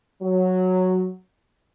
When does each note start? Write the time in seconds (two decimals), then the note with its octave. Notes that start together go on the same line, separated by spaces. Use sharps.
0.22 F#3